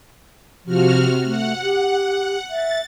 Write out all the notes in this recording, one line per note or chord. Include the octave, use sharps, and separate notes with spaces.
C3 F3 F#4 F6
A3 F#5
G4
E5 A6